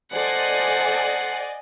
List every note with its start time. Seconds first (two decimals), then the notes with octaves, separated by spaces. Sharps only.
0.12 A4 C5 D5 D#5 F#5 G#5 C6